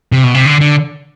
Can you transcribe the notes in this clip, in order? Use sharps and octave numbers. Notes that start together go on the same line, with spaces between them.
C3
B2
C3
D3
D3